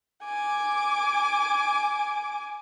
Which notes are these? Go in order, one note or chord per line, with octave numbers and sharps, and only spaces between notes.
G#5 D6